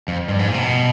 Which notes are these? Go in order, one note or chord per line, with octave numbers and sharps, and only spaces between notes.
F2
G2
G#2
A#2
C3
B2